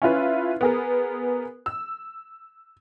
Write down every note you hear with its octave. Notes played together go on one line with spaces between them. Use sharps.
C#4 E4 F4 B4
B3 G#4 A#4
E6